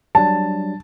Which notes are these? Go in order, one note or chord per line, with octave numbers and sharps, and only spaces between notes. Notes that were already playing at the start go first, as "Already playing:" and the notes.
F#3 G3 D4 A5